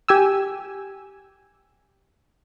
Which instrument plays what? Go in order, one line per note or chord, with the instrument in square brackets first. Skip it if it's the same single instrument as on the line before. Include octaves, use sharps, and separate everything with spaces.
[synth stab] G4 G#5 E6